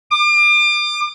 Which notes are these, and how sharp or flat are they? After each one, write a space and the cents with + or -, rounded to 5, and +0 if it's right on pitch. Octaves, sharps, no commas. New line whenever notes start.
D6 +35